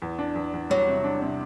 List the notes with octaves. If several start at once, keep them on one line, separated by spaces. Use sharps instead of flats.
E2
D4
E2
E2
F#3 G3
C3
D4
C3